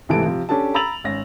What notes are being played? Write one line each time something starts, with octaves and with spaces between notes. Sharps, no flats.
G#1 C3 E3 A3 A5 D7
C3 F3
C#4 D4 G4 A4 A5
A#5 B5 E6 A6 F7 F#7
G#1 C#4 A#6